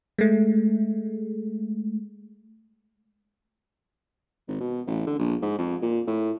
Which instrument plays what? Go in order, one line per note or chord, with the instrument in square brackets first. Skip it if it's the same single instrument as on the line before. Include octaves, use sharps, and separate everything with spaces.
[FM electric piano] G#3 A3
[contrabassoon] G#1
B2
A1
D3
A#1
G#2
F2
A#2
A2